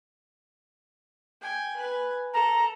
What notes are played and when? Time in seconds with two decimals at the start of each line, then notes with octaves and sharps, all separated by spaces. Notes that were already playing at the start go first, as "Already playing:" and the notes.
1.42 G5 G#5
1.76 B4 G#5
2.33 A4 A#5